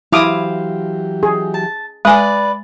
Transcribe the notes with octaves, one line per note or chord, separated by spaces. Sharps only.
E3 F#3 E4 G4 C5 F5 D6 D#6
G#4
A5
G#3 B4 D5 G#5 D#6